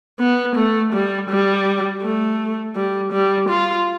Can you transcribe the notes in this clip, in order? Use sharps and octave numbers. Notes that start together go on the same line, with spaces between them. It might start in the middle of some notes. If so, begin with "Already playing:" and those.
B3
A3
G3
G3
A3
G3
G3
F4